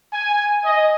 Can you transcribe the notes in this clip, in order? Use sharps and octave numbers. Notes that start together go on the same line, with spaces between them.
G#5
D#5